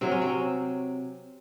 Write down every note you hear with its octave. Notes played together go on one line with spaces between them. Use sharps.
C3 F#3 C4
C#4
C4